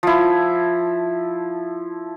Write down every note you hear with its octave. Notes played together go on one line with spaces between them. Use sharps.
F3 E4